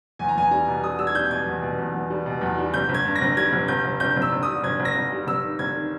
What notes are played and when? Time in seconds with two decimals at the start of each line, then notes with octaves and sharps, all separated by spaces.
0.19 E2 G#5
0.28 A#5
0.36 E2 G#5
0.51 G3 A#5
0.67 B2
0.83 G3 D#6
0.99 G3 E6
1.07 G#6
1.15 G3 G6
1.31 B2 G#6
1.47 E2
1.62 B2
1.78 E2
1.94 E2
2.10 G3
2.26 B2
2.41 E2
2.58 G3
2.74 G1 G6
2.89 G1
2.94 G#6
3.05 G2
3.16 A#6
3.21 G1
3.37 G3 G#6
3.53 G1
3.68 G1 G6
3.85 G1
4.00 G1 G6
4.17 G1
4.22 E6
4.32 G1
4.43 D#6
4.48 G3
4.63 G1 G#6
4.80 G1
4.85 A#6
4.95 G1
5.12 G3
5.27 G1 E6
5.43 D#3
5.59 G1 G#6
5.75 D#3